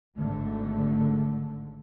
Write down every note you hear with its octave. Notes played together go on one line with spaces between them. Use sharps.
G#1 G#2 D3 A3